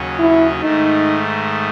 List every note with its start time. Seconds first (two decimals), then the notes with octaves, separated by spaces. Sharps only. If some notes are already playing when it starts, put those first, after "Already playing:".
Already playing: D#2 C#3 F#3 C#4
0.19 E4
0.60 G#2 D#3 A3 D#4